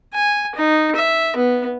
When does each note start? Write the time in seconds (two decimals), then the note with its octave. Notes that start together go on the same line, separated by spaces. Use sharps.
0.14 G#5
0.55 D#4
0.96 E5
1.36 B3